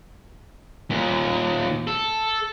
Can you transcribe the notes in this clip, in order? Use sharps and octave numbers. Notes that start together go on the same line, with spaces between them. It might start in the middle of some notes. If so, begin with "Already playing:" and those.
D#2 A#2
A4